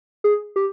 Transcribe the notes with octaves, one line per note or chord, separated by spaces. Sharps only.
G#4
G4